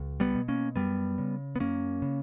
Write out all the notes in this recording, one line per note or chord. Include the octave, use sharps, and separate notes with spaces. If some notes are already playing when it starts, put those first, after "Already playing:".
Already playing: C#2
G3 B3
B2
A#3 C#4
F#2 G3 B3
C#3
B3
F#2 A#3 C#4
C#3